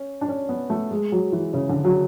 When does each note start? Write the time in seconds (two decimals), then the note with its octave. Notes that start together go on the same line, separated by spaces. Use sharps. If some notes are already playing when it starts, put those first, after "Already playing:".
Already playing: C#4
0.21 D4
0.29 C#4
0.49 B3
0.70 A3
0.91 G#3
1.12 F#3
1.32 E3
1.54 C#3
1.69 D3
1.84 F#3